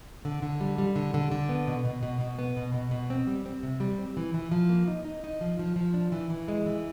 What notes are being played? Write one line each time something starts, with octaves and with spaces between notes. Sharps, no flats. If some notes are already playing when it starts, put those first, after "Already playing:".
D3
D3
G3
G3
D3
D3
D3
B3
B2
B2
B2
B2
B3
B2
B2
B2
C4
G3
C4
C3
G3
C4
E3
E3
F3
A#3
D#4
D#4
D#4
F3
F3
F3
D4
E3
E3
G#3
E3